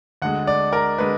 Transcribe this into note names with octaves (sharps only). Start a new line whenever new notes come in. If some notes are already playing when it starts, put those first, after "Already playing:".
D2 D3 G#3 F#5
D5
A#4
D3 G#3 B4